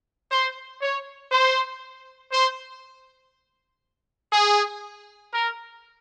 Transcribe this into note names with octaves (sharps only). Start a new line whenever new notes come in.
C5
C#5
C5
C5
G#4
A#4